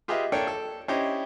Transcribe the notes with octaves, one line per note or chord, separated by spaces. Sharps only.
F4 G4 G#4 B4 D#5 E5
A#3 D4 A4 C#5 G5
A4
C#4 D4 E4 G4 C5 D#5